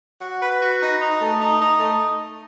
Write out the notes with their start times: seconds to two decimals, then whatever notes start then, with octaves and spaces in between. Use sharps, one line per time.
0.21 F#4
0.42 B4
0.61 F#4
0.81 D#4
1.01 D#4
1.20 A3
1.39 D#4
1.60 D#4
1.79 A3